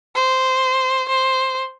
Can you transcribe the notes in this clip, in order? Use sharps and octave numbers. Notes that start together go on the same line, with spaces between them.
C5
C5